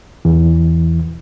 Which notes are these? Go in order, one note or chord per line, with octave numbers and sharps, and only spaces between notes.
E2 E3